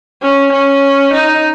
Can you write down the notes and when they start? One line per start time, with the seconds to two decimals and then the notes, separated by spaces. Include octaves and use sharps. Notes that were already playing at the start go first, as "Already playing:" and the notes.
0.22 C#4
0.52 C#4
1.13 D#4